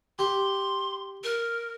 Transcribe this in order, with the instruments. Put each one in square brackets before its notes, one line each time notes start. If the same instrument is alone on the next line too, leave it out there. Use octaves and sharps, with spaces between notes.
[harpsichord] G4 [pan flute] C6
[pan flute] A#4